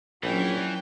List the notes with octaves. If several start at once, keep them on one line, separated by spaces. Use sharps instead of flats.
A#1 E3 F#3 C#4 G5